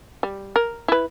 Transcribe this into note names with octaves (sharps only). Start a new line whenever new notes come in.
G3
A#4
E4 B4